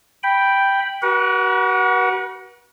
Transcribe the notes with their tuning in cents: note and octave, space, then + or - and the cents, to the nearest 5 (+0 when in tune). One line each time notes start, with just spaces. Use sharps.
G5 +0 B5 +0
F#4 +40 B4 -45 F#5 +0